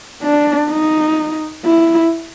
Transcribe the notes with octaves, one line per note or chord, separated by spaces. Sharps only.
D4
D#4
E4